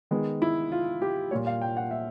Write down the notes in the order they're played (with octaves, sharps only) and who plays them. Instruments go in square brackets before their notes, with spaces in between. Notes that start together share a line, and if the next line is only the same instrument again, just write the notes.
[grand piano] D#3 G#3 B3
E4
F4
G4
A#2 G3 A#3 C#5
F5
G5
F#5
E5